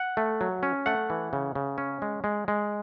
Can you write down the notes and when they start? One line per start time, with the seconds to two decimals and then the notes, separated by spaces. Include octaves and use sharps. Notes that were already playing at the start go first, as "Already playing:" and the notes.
Already playing: F#5
0.17 A3
0.41 F#3
0.63 C#4
0.86 A3 F#5
1.10 E3
1.33 C#3
1.55 C#3
1.78 C#4
2.02 G#3
2.24 G#3
2.48 G#3